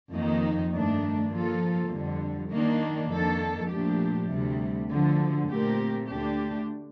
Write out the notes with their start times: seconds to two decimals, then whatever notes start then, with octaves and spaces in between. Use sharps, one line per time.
0.11 F2 D#3 A#3 D#4
0.72 G2 D#3 A3 D4
1.32 F3 A#3 F4 A4
1.91 F2 D3 G3
2.51 D#3 A#3 D4
3.10 F2 D#3 A#3 D4 A4
3.70 A#2 F3 A3 D4 G4
4.30 D2 C3 G3
4.90 D2 D3 F3
5.49 A#2 A3 C4 G4 A#4
6.08 D2 D3 A3 D4 G4